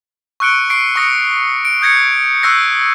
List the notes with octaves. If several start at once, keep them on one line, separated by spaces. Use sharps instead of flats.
C#6 E6 F#6 C#7 D7 G7
C#6 C7 D7
C#6 D#6 A#6 C#7
D7
D#6 G6 G#6 A#6 C#7
C#6 E6 F#6 G6 A#6 C7